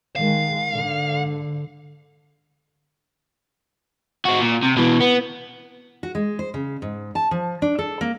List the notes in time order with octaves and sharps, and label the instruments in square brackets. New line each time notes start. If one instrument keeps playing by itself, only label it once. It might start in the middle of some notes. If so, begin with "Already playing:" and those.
[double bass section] D#3 G#3 [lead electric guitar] F5
[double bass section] G#2 D3
[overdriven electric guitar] C4 F#4
A#2
C3
B2 E3
B3
[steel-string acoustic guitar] F#4
G#3
C5
C#3
G#2
A5
F3
D4
A4
A#3